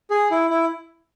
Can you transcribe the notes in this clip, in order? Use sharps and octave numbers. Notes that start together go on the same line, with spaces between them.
G#4
E4
E4